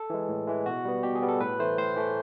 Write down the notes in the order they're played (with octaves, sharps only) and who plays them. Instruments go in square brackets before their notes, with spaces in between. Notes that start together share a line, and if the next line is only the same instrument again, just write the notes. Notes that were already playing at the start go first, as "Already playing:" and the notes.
Already playing: [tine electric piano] A4
E3 G#3
A2
E3 G#3
B2 F#4
G3 B3
B2 G4
G#4
G3 B3
A4
A2 B4
E3 A3 C5
A2 C5
E3 A3